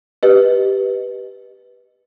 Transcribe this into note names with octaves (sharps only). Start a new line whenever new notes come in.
G4 B4 D#5